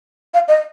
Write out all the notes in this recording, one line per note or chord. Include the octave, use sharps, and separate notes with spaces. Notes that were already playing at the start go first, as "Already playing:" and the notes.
F5
D#5